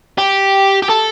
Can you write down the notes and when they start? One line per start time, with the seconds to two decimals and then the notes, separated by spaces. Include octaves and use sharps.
0.18 G4
0.82 G4
0.89 A4